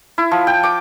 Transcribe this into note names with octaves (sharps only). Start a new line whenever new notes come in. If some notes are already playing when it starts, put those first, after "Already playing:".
E4
F3
G5
D6